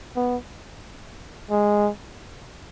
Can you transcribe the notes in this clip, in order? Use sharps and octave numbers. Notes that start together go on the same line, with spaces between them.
B3
G#3